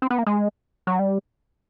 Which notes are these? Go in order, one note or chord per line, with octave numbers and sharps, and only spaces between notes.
C4
B3
A#3
G#3
F#3
G3